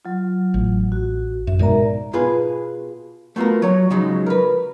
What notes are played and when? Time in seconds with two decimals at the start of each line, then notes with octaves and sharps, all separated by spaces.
0.05 F#3 F4
0.54 A1
0.92 F#4
1.47 F#2 E5
1.59 G#2 B2 G#3 A#4 D5 A#5
2.13 B2 F4 G#4 B4
3.36 A3 B3 F4 F#4 A#4
3.62 F#3 C#5
3.90 C#3 F3 F#3 G#3 D#4
4.26 A#4 B4